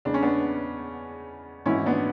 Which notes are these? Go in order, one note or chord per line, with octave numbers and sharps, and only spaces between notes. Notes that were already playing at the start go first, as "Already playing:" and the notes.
E2 C#3 G#3 D4
C#4
B3 D4
G#1 G#2 E3 C#4 E4
B3 D4